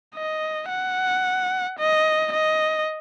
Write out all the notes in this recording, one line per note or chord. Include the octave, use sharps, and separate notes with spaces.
D#5
F#5
D#5
D#5